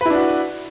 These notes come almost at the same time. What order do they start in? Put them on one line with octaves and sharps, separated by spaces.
B4 E4 D4 F#4